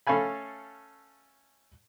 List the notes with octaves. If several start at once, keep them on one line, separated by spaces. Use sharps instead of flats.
A3 C#4 A4 F5 G#5 B5